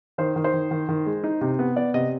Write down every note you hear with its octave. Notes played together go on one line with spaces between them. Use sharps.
D#3 C5
D#3
C5
D#3
D#3
D#3
G#3
D#4
C3
B3
B3 D5
C3 D#5